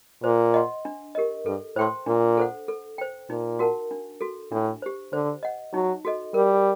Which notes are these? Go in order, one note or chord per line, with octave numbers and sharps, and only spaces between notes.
A#2 C5
D#5 F#5 C6
D4
G4 A#4 D#5
G2 A4
A2 C5 G5 C6
A#2 D4
A4 C5 F#5
A4
C5 G5
A#2 D#4
F#4 A#4 F#5 A5
D4
F#4 A4
A2 D4
G4 C5
D3 C5
D#5 F#5
F#3 D#4
F#4 A4 D#5
G3 A#4